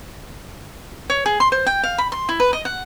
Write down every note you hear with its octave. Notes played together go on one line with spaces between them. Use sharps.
C#5
G#4
C6
C5
G5
F5
B5
C6
E4
B4
D#5
F#5